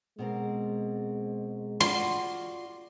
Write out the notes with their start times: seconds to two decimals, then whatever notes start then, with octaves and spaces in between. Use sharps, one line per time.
0.19 B2 G#3 C4 A#4
1.80 F4 F#4 D5 C6